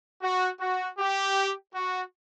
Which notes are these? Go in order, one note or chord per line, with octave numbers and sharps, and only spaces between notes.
F#4
F#4
G4
F#4